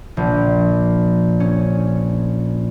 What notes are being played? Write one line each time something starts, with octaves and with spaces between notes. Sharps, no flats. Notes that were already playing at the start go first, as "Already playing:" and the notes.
A#1
C#4